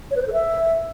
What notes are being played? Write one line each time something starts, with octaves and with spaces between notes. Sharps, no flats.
C#5
B4
C5
A4
E5